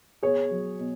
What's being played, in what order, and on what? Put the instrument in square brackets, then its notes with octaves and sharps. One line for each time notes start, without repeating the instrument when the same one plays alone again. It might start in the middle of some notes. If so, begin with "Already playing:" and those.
[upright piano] B2 G#4 C#5
F#3
B2